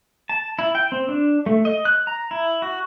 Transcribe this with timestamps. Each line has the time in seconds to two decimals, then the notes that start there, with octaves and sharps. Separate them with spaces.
0.29 A5
0.59 E4
0.75 G5
0.92 C4
1.09 D4
1.46 A3
1.65 D#5
1.85 F#6
2.07 A#5
2.31 E4
2.62 F#4